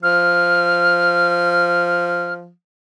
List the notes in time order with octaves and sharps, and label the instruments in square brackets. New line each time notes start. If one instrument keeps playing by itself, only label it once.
[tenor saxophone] F3 [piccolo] F6